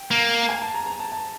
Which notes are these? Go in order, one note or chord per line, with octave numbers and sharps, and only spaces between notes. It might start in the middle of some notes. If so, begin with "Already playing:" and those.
Already playing: G5
A#3
G#5
A5
A#5
A#5
A5
A5